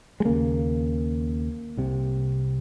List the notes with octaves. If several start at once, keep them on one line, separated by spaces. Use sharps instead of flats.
G#3
D#2 C#3 A#3
C2 C3